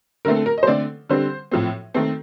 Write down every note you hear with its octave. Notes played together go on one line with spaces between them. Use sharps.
D3 A3 C4 A#4
A4
A#4
D#5
C5
D3 A3 C4 D5
D3 G3 C4 C5
A2 F3 C4
D#3 A3 C4 A4